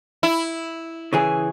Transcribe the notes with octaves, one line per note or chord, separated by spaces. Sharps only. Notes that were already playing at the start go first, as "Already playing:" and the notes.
E4
C#3 E3 G#4